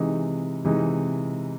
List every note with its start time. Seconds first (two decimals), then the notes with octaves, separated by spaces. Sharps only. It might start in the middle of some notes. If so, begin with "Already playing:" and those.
Already playing: C3 E3 G#3 D#4
0.65 C3 E3 G#3 D#4